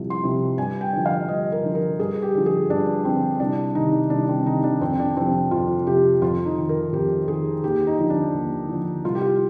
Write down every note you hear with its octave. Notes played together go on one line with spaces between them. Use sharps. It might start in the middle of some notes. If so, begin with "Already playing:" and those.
Already playing: C2 C3 F3
C6
C3 F3
G2 G#5
G5
D3 F3
F5
G2 D#5
A#4
D3 F3
A#4
G2 G#4
G4
D3 F3
G#4
G2 D4
D3 F3 C4
C2 D4
C3 D#3 D#4
C2 D4
C4
C3 D#3 D#4
D4
F2 C4
D4
C3 F3 C4
F2 F4
C3 F3 G4
F2 F4
D#4
D#3
A#4
F2 G4
D#3 G#4
D#2 G4
D#4
D3 F3
D4
D#2
D3 F3
C2 F4
G4
F4